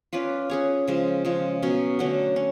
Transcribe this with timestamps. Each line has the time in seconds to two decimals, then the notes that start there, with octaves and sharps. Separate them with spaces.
0.13 C#4 F4 B4 D5
0.50 C#4 G#4 C#5
0.88 C#3 F3 G#3
1.25 C#3 F3 G#3
1.62 B2 F#3 C#4
1.99 D3 F#3 A3 C#4
2.36 C#4